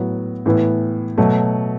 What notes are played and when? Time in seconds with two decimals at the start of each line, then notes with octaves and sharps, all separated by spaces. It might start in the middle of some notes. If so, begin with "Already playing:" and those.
Already playing: A2 F#3 B3
0.46 A2 E3 B3
1.18 B2 F#3 A3